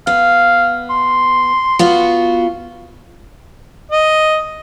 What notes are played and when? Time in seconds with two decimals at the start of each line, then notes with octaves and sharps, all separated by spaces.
0.07 B3 F5
0.90 C6
1.79 B3 F4 F#4
3.91 D#5